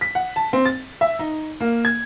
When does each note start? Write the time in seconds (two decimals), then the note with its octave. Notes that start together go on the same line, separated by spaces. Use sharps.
0.01 B6
0.15 F#5
0.36 A5
0.53 C4
0.65 A6
1.01 E5
1.19 D#4
1.60 A#3
1.85 G#6